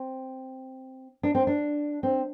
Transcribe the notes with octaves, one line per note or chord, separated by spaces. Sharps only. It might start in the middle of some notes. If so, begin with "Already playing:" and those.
Already playing: C4
D4
C4
D4
C4